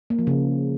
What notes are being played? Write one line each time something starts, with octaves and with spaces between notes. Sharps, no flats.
A#3
F3
C#3